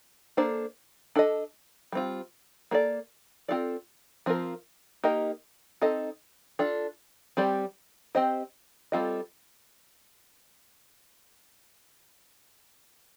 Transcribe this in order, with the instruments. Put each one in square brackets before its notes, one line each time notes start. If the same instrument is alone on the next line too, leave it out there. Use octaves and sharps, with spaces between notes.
[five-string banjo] A#3 D4 A4 C5
D4 A4 D#5
G3 C4 F4
A#3 D4 A4 D5
C4 F4 A4 D5
F3 C4 F4 A#4
A#3 D#4 G4 A#4 D#5
C4 D#4 A4 D#5
D4 F4 A4
G3 C4 G4 D5
C4 G4 C5 D#5
G3 C4 F4 A4 D#5